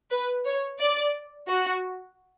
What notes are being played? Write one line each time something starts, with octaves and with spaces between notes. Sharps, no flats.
B4
C#5
D5
F#4